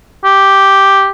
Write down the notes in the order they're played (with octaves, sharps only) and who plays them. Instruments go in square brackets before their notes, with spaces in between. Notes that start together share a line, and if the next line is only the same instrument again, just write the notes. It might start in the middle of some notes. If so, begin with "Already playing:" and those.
[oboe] G4